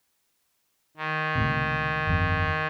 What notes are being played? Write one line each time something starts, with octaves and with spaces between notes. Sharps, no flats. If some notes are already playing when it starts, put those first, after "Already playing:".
D#3
C#2 A2 C3
G1 F2